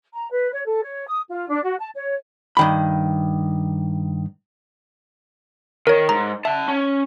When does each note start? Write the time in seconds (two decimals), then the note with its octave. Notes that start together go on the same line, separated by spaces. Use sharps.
0.12 A#5
0.31 B4
0.52 C#5
0.66 A4
0.83 C#5
1.08 D#6
1.29 F4
1.49 D4
1.64 F#4
1.79 A5
1.94 C#5
2.57 G2 D#3 B5
5.87 D#3 A#4 C#5
6.09 G#2 A#5
6.45 E5 F#5 A5
6.68 C#4